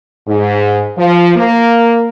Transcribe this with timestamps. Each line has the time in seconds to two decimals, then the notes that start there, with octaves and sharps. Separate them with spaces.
0.27 G#2
0.98 F3
1.36 A#3